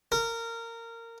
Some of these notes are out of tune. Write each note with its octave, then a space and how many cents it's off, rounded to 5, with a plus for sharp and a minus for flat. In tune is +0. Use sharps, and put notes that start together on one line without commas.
A#4 -20